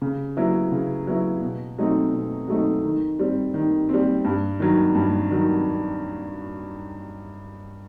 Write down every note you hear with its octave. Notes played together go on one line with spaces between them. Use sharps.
C#3
F#3 B3 E4
C#3
F#3 B3 E4
B2
F#3 A3 C4 D#4
B2
F#3 A3 C4 D#4
D#3
G3 C4
D#3
G3 C4
G2
D#3 F#3
G2
D#3 F#3